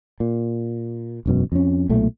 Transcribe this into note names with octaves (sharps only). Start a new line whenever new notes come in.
A#2
E1 F#2 B2
F2 C#4
B1 A#2 A3